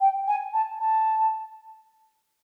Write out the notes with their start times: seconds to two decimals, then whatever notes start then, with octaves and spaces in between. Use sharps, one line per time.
0.01 G5
0.27 G#5
0.53 A5
0.79 A5